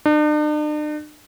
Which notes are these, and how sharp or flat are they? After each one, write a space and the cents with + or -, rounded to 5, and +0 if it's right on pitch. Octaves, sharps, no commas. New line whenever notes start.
D4 +45